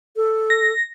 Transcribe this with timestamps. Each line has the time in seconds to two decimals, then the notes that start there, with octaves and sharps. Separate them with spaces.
0.16 A4
0.50 A#6